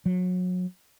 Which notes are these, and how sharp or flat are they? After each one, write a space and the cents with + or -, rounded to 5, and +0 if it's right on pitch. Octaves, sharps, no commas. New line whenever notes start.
F#3 -30